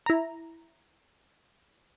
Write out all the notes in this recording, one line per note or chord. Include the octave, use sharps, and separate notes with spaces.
E4 A#5